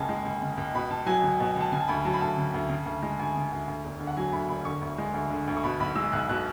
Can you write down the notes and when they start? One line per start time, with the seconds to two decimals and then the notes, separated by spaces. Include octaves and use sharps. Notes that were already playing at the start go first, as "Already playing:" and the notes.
Already playing: F#1 C#2 C#3 G#5 A5
0.09 G#3
0.25 C#2
0.42 C#3
0.57 C#2
0.74 B2 B5
0.90 C#2 A5
1.06 F#3 G#5
1.23 C#2
1.40 B2
1.56 C#2 A5
1.72 C#3 G#5
1.80 A5
1.88 D2 B5
2.05 F#3 A5
2.13 B5
2.21 D2 A5
2.37 C#3
2.54 D2
2.69 C#3
2.86 D2
3.02 G#3
3.19 D2 G#5
3.36 C#3
3.52 D2
3.68 D2
3.85 E1
4.00 D3
4.07 F#5
4.17 F#3 G#5
4.32 D2 B5
4.49 E1 B5
4.65 D3 C#6
4.81 D2
4.98 G#3
5.14 D2
5.30 D3
5.47 D2
5.57 C#6
5.64 B2 B5
5.80 B1 B5
5.95 G#3 E6
6.12 B1 F#6
6.29 B2 F#6